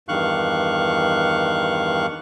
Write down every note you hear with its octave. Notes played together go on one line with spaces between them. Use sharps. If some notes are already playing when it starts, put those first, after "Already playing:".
E2 G2 D#3 F5 C#6 F#6